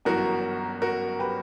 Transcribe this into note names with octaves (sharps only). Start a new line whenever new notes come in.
G1 F#2 E3 F#4 A#4
F#4 A#4
G4 B4